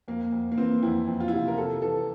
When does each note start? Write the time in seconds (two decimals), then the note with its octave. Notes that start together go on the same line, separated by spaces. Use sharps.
0.08 F2 A#3
0.32 F2
0.52 A#3
0.58 E3 C4
0.83 F2 E4
1.08 F2
1.20 F4
1.28 E4
1.33 C3 F4
1.48 A#4
1.58 C3 A4
1.82 E3 A4